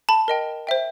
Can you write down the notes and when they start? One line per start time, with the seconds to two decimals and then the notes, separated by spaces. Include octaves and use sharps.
0.09 A5 B5
0.28 A#4 D#5 G5
0.67 C5 E5 G5